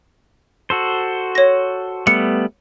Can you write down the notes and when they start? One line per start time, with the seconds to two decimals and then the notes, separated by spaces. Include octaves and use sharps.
0.70 F#4 A4 C5
1.35 C#5 A#6
2.07 G3 A3 B3 C#7